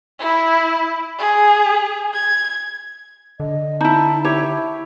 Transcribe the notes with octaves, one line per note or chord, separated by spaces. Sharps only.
E4
G#4
G#6
D3 D#5
D#4 E4 A5
E4 G4 C#5